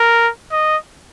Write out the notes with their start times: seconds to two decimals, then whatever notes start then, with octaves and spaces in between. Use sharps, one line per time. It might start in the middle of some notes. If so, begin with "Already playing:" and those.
Already playing: A#4
0.51 D#5